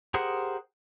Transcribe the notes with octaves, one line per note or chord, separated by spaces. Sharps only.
G4 G#4 A#4 C5 F#5